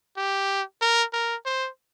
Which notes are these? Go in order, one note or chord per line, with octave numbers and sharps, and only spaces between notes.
G4
A#4
A#4
C5